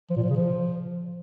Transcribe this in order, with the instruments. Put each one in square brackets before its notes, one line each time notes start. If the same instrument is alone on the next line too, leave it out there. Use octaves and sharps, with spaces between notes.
[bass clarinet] F3
A#2
F3
C#3
F3